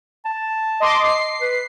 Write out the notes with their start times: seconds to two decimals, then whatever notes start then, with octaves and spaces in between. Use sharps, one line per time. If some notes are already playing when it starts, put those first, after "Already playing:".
0.25 A5
0.80 D#5 C6 D6
1.03 C7
1.41 B4